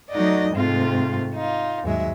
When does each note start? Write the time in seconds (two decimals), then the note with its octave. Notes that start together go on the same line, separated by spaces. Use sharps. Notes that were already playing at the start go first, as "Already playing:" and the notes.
0.10 F#3 A3 D#4 F#4 D5 D#5
0.53 G#2 C3 A3 C4 F4
1.34 D#4 F4
1.84 D#2 G#2 F#3 G#3 E5